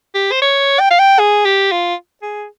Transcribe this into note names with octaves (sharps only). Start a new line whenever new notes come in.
G4
C5
C#5
G5
F5
G5
G#4
G4
F4
G#4